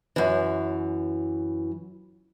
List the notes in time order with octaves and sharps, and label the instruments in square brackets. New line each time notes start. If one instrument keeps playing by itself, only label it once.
[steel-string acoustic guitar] F#2 E3